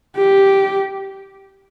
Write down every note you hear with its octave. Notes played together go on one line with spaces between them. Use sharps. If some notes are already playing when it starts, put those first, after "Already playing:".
G4